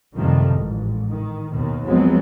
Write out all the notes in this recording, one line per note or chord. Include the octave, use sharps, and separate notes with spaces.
F#2 C3 D#3 F3 G3 A3
A1 G#2
D#3
D#2 B2 D#3
F3 F#3 G#3 B3 C4